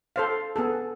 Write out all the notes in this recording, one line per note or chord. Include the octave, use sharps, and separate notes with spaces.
A4 C5 F5
B3 G#4 A4